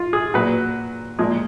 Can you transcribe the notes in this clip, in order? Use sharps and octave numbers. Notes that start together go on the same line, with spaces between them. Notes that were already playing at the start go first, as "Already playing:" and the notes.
Already playing: F4
G#4
A#2 F#3 B4
A#2 F3 G#3